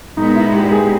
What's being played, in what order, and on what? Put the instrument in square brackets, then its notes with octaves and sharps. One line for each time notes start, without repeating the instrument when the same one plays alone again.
[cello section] A#2 G#3 B3 [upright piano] D#4
[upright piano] E4
G4
G#4